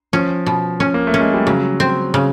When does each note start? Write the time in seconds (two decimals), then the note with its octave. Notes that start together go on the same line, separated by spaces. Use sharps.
0.13 F3 C#4
0.46 B2
0.80 C#4
0.94 A#3
1.07 A3
1.14 C#4
1.20 G#3
1.34 G3
1.47 C#3 F#3
1.80 C4
2.14 C#3